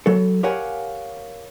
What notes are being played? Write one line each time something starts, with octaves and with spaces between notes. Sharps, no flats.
F#3 A4
G4 A#4 C#5 F5 F#5 G#5